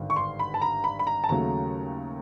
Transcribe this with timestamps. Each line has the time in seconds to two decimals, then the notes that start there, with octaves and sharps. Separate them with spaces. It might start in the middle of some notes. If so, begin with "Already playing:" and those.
Already playing: G#1 G2 D3
0.10 C#6
0.16 C6
0.39 B5
0.54 A5
0.62 A#5
0.84 B5
0.99 B5
1.07 A#5
1.24 A5
1.29 D#2 C#3 F#3 A3 A#5